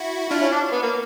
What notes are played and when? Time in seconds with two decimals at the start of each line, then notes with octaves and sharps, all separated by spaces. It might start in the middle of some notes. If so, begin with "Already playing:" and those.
Already playing: E4 F#4
0.31 D4 E4 F4
0.41 C#4
0.52 D4
0.73 B3
0.83 A#3